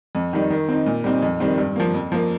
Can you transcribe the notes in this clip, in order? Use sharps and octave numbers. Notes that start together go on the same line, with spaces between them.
F2
D#3 G3 D#4
D#3
C4 D#4
A#2
G3 C4 D#4
F2
D#3 G3 C4
G2
F3 A#3
F2
F3 A#3